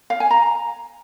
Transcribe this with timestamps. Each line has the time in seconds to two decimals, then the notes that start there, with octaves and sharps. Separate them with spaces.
0.10 F5
0.20 G#5
0.31 A#5